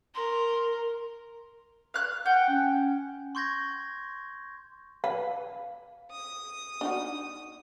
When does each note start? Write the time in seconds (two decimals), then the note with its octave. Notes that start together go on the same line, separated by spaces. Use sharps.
0.15 A#4 C6
1.94 F5 F#6
2.26 F#5 G5
2.49 C#4
3.35 C6 C#6 G6 G#6 A#6
5.04 B4 F5
6.11 D#6
6.81 D4 D#4 F#4